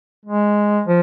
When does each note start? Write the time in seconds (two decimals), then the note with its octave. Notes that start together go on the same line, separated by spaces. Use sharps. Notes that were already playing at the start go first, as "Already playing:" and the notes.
0.25 G#3
0.87 F3